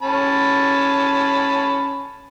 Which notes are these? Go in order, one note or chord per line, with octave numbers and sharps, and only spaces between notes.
C#4 A5 B5